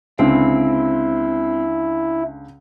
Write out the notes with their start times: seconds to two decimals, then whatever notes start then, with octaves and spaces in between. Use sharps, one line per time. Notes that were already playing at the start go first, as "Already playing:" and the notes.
0.19 C#2 D3 C4 E4